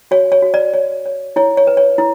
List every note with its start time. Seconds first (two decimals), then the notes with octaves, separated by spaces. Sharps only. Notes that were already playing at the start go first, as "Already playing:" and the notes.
0.11 F#4 C#5
0.32 C#5
0.42 F#4
0.54 D5
0.74 C#5
1.06 C#5
1.36 E4 C#5
1.57 C#5
1.67 B4
1.77 C#5
1.98 E4